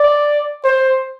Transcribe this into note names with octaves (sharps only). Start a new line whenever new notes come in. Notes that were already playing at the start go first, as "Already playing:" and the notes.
Already playing: D5
C5